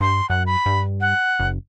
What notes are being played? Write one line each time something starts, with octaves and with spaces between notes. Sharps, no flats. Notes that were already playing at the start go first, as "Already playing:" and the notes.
G2 C6
F#2 F#5
B5
G2
F#5
F#1